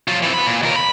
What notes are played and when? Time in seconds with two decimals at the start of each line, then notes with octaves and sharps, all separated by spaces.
0.08 F#3 F4
0.22 E3 C4
0.34 B3 B5
0.47 A#2
0.62 D#2 A#4
0.76 B5